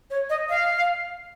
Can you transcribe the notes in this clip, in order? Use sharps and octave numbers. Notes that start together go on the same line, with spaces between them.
C#5
D#5
F5